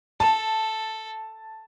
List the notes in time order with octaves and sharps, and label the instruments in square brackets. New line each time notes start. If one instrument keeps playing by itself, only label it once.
[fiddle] A4 [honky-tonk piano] A5